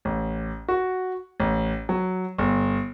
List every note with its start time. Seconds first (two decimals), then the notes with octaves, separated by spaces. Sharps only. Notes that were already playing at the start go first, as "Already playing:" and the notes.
0.05 A1
0.68 F#4
1.40 A1
1.89 F#3
2.38 G1